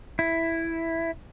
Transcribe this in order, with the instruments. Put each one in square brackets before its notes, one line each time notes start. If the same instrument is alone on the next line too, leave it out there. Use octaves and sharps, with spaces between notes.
[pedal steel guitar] E4